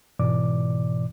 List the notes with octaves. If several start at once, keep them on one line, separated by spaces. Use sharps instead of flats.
G#2 B2 E3 D5 D6